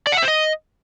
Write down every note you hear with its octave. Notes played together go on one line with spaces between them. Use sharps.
D5
F#5
E5
C5
D#5